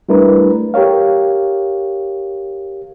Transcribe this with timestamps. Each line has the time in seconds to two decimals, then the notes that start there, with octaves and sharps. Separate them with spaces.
0.09 G3 A3 D4 E4 A#4 B4
0.74 G4 A#4 C#5 F5